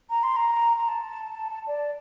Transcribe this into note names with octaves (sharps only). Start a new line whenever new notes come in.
A#5
C6
A#5
A#5
A5
D5